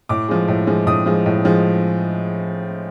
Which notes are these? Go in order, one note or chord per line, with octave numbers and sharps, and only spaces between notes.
A2 D6
F3 G#3
A2
F3 G#3
A2 D#6
F3 G#3
A2
F3 G#3